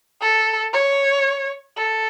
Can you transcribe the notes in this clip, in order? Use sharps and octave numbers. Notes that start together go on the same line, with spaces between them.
A4
C#5
A4